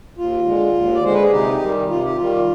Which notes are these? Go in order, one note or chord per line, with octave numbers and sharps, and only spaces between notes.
D#2 F4
D3 G#3
D#2
D5
D3 G#3 C5
B4
G#4
C3 D#4 G4
D#3 G3
C3 F4
G4
D#3 G3 F4